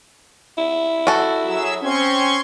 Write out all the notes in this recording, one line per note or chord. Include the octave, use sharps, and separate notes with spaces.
E4
F#4 A4
F#3 G#4 E5 E6
C4 C#4 C6 C#6 G#6